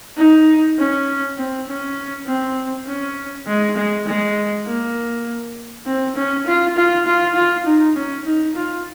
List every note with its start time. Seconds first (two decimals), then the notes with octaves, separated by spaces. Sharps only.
0.17 D#4
0.78 C#4
1.38 C4
1.68 C#4
2.27 C4
2.86 C#4
3.47 G#3
3.76 G#3
4.07 G#3
4.66 A#3
5.86 C4
6.15 C#4
6.46 F4
6.77 F4
7.06 F4
7.35 F4
7.66 D#4
7.96 C#4
8.25 D#4
8.55 F4